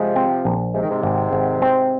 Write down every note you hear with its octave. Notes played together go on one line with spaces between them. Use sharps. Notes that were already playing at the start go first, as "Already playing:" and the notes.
Already playing: C3 F3 G#3
C4
A#1
C3 G#3
D#3
G#2 C3
G#1
G#1
C4